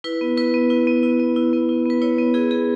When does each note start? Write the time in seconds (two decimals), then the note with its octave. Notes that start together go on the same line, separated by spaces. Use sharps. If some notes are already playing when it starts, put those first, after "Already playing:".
0.04 E4 B4
0.21 B3
0.37 E4 B4
0.54 B3
0.70 E4
0.87 B3
1.03 E4
1.20 B3
1.36 E4
1.53 B3
1.69 E4
1.85 B3 B4
2.02 E4 C#5
2.18 B3
2.34 E4 G#4
2.51 B3 G#4